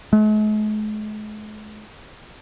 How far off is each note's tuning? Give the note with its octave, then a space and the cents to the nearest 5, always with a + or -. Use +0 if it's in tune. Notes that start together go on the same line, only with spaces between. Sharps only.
G#3 +45